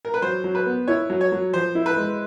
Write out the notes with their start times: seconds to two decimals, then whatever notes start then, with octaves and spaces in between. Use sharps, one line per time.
0.05 A#4
0.14 B4
0.22 F#3 C5
0.44 F#3
0.55 B4
0.66 B3
0.88 E4 C#5
1.10 F#3
1.21 C#5
1.32 F#3
1.53 F3 C5
1.75 E4
1.86 B4
1.97 G#3